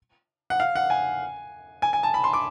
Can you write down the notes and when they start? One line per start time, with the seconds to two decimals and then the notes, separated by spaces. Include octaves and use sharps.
0.50 F#5
0.60 F5
0.75 F#5
0.90 G#5
1.82 G#5
1.93 G#5
2.03 A5
2.14 B5
2.24 C6
2.33 D6